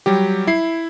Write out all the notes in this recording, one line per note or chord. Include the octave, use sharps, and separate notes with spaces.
F#3 G3 G4
E4 C7